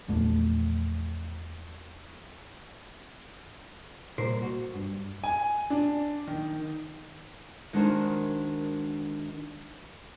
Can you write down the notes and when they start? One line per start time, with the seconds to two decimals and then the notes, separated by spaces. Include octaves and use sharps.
0.08 A#1 E2 A3
4.18 C2 A#2 A#4 C5
4.42 F#4
4.74 G2
5.24 G#5
5.70 D4
6.27 D#3
7.73 D#3 G#3 D4 F#4 A#4 C5